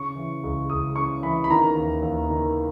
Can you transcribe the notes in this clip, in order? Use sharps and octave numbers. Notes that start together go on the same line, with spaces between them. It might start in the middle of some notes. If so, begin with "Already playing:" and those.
Already playing: C#3 C#6
E3
C#2
C#2 D#6
C#3 C#6
E3 B5
B5
D#3 A#5
D#2
D#2
D#3